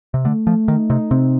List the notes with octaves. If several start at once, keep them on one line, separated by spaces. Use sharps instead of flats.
C3
D3 A3
F3 A3
D#3 D#4
C3 D#4
C3 C4